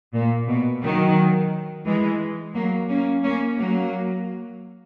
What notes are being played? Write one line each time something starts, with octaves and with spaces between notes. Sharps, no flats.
A#2
B2
D#3 F#3
E3 G#3
F#3 A#3
A#3 C#4
A#3 C#4
F#3 A#3